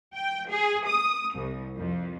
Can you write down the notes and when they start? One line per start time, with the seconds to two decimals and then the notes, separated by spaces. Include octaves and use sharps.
0.15 G5
0.50 G#4
0.88 D#6
1.36 C2
1.77 F2